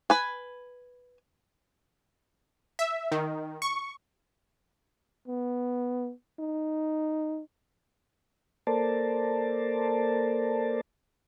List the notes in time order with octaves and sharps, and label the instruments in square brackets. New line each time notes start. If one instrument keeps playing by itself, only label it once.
[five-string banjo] B4 G#5
[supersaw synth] E5
D#3
C#6
[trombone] B3
D#4
[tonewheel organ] A#3 A4 A#4 C5 D5 A5